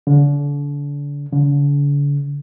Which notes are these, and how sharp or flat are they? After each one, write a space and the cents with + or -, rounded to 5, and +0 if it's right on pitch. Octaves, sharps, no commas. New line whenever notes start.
D3 -35
D3 -45